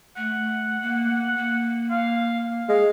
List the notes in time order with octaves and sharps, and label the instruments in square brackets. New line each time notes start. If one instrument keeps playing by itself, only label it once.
[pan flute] A3 [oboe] F#5
[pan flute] A#3
A#3
[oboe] F5
[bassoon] G#3 [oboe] F5